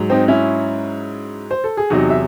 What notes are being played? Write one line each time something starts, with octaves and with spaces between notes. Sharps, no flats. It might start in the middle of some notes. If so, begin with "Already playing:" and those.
Already playing: G#2 F#3
C4 D#4
C#4 E4
C5
A4
G#4
E2 C3 F#3 D#4 F#4
E5